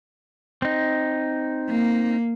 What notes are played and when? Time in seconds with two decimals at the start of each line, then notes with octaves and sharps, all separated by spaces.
0.62 C4 D#4
1.71 A#3